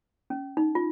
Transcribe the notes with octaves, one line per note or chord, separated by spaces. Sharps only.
C#4
D#4
F4